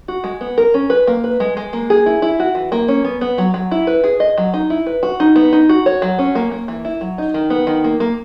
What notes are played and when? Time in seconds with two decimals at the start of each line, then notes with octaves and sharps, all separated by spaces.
0.08 F#4
0.24 G#3
0.41 B3
0.58 A#4
0.74 C#4
0.90 B4
1.07 A#3
1.24 B4
1.40 G#3
1.57 G#3
1.73 A#3
1.90 G#4
2.06 E4
2.22 E4
2.40 F#4
2.55 E3
2.72 A#3
2.88 C#4
3.04 B3
3.21 B3
3.38 F#3
3.54 F#3
3.71 E4
3.87 B4
4.04 G#4
4.20 D#5
4.38 F#3
4.54 D#4
4.70 E4
4.87 B4
5.03 F#4
5.20 D#4
5.36 B3
5.53 D#4
5.69 F#4
5.86 C#5
6.02 F#3
6.19 C#4
6.35 A#3
6.52 A#3
6.68 E3
6.85 E4
7.01 F#3
7.18 D#4
7.34 D#3
7.50 B3
7.67 D#3
7.84 A#3
8.00 A#3